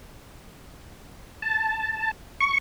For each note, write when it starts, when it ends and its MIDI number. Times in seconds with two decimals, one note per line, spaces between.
1.42 2.11 81
2.40 2.58 85